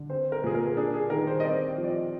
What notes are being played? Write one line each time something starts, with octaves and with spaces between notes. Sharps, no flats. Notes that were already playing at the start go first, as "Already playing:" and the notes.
Already playing: D3
C4 C5
A#4
A#2 G#4
A#4
D4 G#4
G#4
D#3 A#4
C5
D#5
C4 D5
D5
F3
D5
D#5